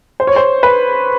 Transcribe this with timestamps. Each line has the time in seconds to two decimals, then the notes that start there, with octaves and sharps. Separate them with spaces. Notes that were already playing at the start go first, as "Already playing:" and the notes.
0.20 C5
0.27 C#5
0.36 C5
0.63 B4